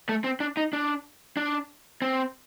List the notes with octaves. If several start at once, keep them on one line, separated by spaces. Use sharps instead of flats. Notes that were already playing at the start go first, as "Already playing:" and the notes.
A3
C4
D4
D#4
D4
D4
C4